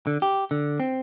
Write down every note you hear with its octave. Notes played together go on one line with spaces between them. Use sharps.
D3
G4
D3
C4